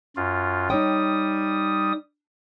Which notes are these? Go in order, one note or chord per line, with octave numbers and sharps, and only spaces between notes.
F#2 F4
G3 D#4 C#5 G5 D#6